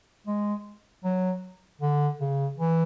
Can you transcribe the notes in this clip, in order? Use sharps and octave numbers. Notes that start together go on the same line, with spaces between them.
G#3
F#3
D3
C#3
E3